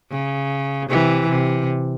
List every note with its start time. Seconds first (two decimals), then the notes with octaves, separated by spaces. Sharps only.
0.11 C#3
0.89 C3 E3
1.30 C3